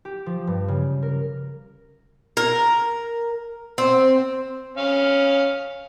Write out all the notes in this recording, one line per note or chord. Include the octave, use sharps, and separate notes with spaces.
G4
F3
G2
C#3
A#4
A#4
C4
C#4 F5